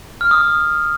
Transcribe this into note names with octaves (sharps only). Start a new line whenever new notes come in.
F6
D#6